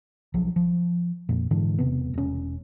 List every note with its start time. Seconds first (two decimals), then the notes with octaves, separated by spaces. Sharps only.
0.34 B1 F3 F#3
0.56 F3
1.29 F2 A#2
1.51 G#2 D3 E3 D4
1.79 E1 C3 B3
2.14 E1 C#4